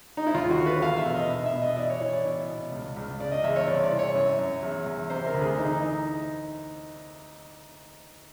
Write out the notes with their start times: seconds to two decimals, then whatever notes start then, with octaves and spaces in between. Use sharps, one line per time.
0.17 D#4
0.27 E4
0.34 D#2 F4
0.51 F#4
0.59 D3
0.66 B4
0.82 E2 F5
0.98 E5
1.06 B2
1.14 D#5
1.29 B2 E5
1.46 E5
1.54 B2
1.62 D#5
1.77 E3 D5
1.90 C#5
2.01 E3 C#5
2.13 D5
2.25 B2
2.49 B2
2.72 C#2
2.97 C#2
3.19 C#3 D5
3.32 D#5
3.44 E2 E5
3.56 C#5
3.68 C2 D5
3.84 D5
3.92 E3
3.99 C#5
4.15 F#2
4.38 F#2
4.63 E2
4.86 E2
5.10 C3 C5
5.26 A#4
5.34 D2
5.42 G#4
5.57 E3 D#4
5.81 D#4